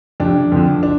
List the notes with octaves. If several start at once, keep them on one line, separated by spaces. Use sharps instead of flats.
F2 C3 F3 D4
F2 D3 F3
D4